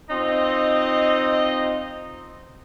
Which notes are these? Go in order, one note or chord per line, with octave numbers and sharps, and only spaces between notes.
C4 D#4 F4 D#5